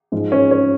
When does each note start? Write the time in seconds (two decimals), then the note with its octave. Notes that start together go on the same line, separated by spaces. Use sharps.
0.12 G#2 F3 G#3
0.32 C#4
0.51 C#4